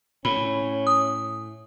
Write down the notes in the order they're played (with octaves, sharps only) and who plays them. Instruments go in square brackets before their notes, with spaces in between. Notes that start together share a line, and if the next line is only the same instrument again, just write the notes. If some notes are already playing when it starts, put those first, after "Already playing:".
[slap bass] A2 [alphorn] C#4 [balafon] B5
[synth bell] D#6